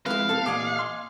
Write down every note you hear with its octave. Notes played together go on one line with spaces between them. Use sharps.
F3 G#3 C4 E4 B4 F5
C3 B3 A4 C5
A#2 E3 G4 D#5 G#5 D6
C6